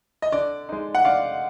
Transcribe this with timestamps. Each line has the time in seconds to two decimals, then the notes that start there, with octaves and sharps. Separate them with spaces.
0.22 D#5
0.32 D3 D5
0.69 G#3 D#4
0.95 F#5
1.04 D3 D5 F5